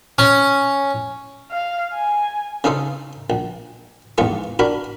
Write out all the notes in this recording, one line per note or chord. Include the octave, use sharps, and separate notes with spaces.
C#4
F5
G#5
C#3 C#4 D#4 A4 C5
A#1
A#1 E2 G#2 F4 C#6
D4 F#4 A#4 B5